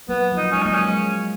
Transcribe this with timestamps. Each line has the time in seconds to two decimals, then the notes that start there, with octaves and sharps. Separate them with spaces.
0.09 F#3 A#3 B3
0.32 F3 D#4
0.43 F#3
0.51 G#3 C#4
0.62 F#3 A#3 D#4
0.74 C#4
0.79 G#3